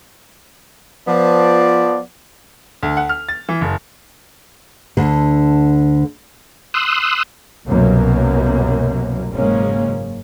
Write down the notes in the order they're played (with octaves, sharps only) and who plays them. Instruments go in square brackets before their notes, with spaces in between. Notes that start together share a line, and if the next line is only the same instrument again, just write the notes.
[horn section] F3 B3 D5
[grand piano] D2
F#5
F6
A6
E3
F#1
[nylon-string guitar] D2 D3
[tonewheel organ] C6 D#6 E6 F#6
[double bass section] C2 F#2 B2 A#3
F#1 G#2 C#3 G#3 A#3 C#4